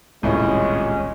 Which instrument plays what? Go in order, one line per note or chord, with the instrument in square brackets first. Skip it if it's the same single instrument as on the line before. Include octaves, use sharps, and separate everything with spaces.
[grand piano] D#1 C2 A2 [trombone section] G#3 C#4